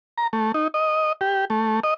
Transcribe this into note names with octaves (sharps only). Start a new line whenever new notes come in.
A#5
A3
D#4
D#5
G4
A3
D#5